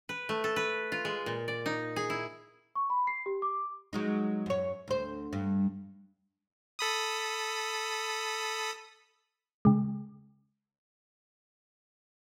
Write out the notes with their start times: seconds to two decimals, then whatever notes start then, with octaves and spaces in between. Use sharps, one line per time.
0.09 B4
0.29 A3
0.44 A4
0.56 B4
0.92 F4
1.05 G#3
1.26 A#2
1.48 D5
1.66 D#4
1.96 G#4
2.10 E4
2.75 C#6
2.90 B5
3.07 C7
3.26 G4
3.42 D6
3.93 F#3 G#3 D#4
4.46 F#2 C#5
4.88 D2 C5
5.33 G2
6.79 A4 B5 D#6
9.65 C#3 G#3